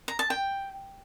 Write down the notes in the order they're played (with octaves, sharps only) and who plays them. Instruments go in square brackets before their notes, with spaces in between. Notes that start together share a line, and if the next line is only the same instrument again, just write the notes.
[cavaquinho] A#5
A5
G5